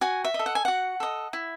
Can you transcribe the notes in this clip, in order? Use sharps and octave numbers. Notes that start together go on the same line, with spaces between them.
F#4 G#5
E5
D#5
A4
F#5
G#5
F#4 F#5
A4 D#5
E4